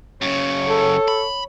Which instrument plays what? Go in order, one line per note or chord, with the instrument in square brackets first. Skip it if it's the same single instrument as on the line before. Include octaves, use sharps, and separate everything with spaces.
[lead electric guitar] F#2 C#3 [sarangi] C#5
[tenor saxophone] A4
[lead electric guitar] B5